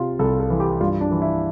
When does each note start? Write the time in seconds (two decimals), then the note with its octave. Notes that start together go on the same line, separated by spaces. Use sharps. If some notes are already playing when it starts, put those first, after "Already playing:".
Already playing: C3 F4
0.19 C2 A4
0.40 A4
0.50 E3
0.60 G4
0.81 G2 F4
1.01 D4
1.11 E3
1.22 E4